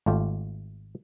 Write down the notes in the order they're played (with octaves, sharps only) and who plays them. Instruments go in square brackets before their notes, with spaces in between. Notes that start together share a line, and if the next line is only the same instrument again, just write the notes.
[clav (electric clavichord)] G#1 A3 F4 G4